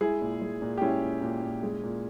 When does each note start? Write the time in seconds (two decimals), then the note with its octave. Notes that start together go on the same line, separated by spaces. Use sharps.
0.01 G#3 E4 G#4
0.21 A#2
0.41 G#3
0.62 A#2
0.77 G4
0.81 G#3 C#4 E4
1.02 A#2
1.22 A#2
1.42 A#2
1.63 G#3
1.83 A#2